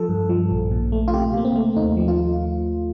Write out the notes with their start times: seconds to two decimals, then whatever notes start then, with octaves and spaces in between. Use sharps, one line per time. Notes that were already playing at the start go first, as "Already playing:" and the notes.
Already playing: F3 A4
0.09 G2
0.29 F3
0.51 A#1
0.71 A#2
0.92 A3
1.08 F4
1.13 C3 G4
1.34 C3 A#3
1.45 C4
1.56 A3
1.76 D#2 D#4
1.97 F3
2.08 F4